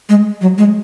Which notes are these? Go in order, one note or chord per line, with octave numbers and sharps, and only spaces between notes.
G#3
F#3
G#3